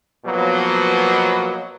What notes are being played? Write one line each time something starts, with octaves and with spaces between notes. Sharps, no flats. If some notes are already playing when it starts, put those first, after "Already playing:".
B2 F3 F#3 A#3 B3